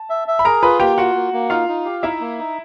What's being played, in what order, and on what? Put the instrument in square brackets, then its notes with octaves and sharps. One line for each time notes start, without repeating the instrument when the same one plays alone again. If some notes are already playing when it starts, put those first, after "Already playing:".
Already playing: [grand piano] A5
[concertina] E5
E5
[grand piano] B5
[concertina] G#4 [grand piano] A#4 A#5
[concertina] F4 [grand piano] B4 B5
[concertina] A#3 [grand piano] G4 G5
[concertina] F4 [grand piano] F#4 F#5
[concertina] A#3
A#3
[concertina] D#4 [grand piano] F4 F5
[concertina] D#4
G4
[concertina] D#4 [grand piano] E4 E5
[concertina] A#3
D#4